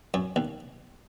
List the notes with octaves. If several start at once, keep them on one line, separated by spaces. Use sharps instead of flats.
F#2
D#2